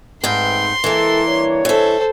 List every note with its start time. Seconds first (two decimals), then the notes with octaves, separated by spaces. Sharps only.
0.24 G#2 A3 C4 B4 G5 C6
0.84 E3 G#3 A#3 E4 A4
1.26 G3 D4 C#5
1.65 E3 A4 C5 E5